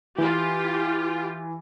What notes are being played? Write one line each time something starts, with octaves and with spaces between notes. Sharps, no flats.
E3 F4 G4